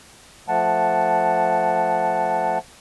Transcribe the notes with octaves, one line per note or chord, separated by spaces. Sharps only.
F3 A3 F#5 A5